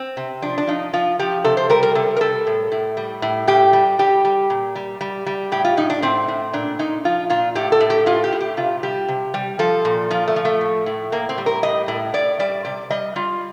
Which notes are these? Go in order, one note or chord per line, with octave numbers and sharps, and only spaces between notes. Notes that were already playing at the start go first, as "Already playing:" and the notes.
Already playing: C4
C3
F3 D4
D4
F3 D#4
F3 F4
F3 G4
C3 A4
C5
G3 A#4
A#4
C3 A4
A#4
G3 A4
A2
A2
G3
A2
A2 G4
G3
G3 G4
G3
A#2
G3
G3
G3
A2 G4
F4
A2 D#4
D4
A2 C4
A2
A#2 D4
A#2 D#4
F3 F4
A#2 F4
A2 G4
A4
A2
G4
A2 F4
G4
A2
G4
C3 F4
G3 G4
C3
G3
F3 A4
A#2
F3 F4
A3
F3
A3
A2
A2
A2 A#3
C4
G3
A#4
A2 D#5
A2
A2 D5
G3 D5
C3 D5
G3 D#5
G3 F4